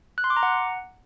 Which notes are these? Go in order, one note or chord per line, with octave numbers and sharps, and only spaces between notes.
F#6
C6
D6
A#5
F#5